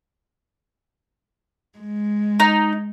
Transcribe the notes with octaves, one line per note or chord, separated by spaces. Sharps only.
G#3
D#4